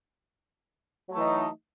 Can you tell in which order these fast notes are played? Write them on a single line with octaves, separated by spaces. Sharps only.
F#3 A3 E3 D#4